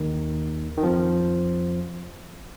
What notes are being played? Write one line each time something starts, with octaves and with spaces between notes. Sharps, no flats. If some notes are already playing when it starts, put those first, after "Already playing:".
Already playing: D#2 D#3
D#3
F2 F3